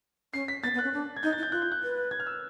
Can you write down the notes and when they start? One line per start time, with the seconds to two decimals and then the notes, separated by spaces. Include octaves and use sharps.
0.33 C#4 C7
0.48 B6
0.63 B3 A6
0.74 B3
0.79 F#6
0.84 C#4
0.93 D4
1.17 G#6
1.23 D#4 G6
1.33 A6
1.38 E4
1.43 G6
1.52 F4 F#6
1.62 G6
1.72 F#6
1.83 B4
2.11 G#6
2.20 F6
2.27 E6